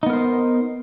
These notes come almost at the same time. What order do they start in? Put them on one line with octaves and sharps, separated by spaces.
D#4 B3 A#4 C5